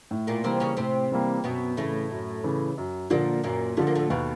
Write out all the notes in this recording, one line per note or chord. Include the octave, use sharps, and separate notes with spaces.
A2
A#2 A#3
C3 E3 G3 A#3 C4
C#3 C#4
A2 C3 C4
E3 G3 A#3
F#2 B2 B3
A2 C#3 E3 A3
F#2
C#3 E3
F#2
A#2 D3 F3 A#3
F#2 A#2 A#3
D3 F3 A3
A#3
A2 A3
D#2 B2 B3